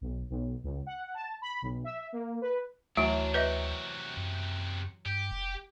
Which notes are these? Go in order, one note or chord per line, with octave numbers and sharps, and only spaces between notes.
B1
B1
C#2
F#5
A5
B5
B1
E5
A#3
B4
D2 E3 F#3 A3 D4 F4
C3 F#4 B4 D#5 E5
F#2
G2 G4
F1